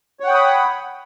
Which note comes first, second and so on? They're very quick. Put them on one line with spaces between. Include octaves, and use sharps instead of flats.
C#5 F#5 G5 D#6 B5